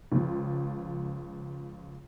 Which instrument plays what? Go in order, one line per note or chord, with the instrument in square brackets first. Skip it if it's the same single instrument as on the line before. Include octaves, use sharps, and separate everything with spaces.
[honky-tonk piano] C#2 F3